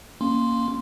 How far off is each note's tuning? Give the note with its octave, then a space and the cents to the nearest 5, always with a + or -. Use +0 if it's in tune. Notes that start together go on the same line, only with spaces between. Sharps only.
A#3 +0 C#4 +0 C6 +0